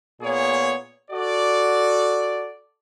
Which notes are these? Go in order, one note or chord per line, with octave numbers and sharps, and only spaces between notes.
A#2 B3 G#4 C#5
F#4 A4 D5